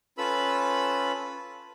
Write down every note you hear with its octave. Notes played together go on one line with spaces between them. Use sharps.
C#4 F4 A4 B4 B5 E6